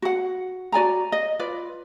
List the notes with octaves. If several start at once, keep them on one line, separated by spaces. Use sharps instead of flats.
F#4 F#5
F#4 D5 G#5 A#5
D#5
F4 B4 D5